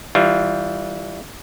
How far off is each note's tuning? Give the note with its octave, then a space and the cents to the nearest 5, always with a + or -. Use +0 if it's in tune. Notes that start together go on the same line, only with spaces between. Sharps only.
E3 -30 G3 +0 F4 -10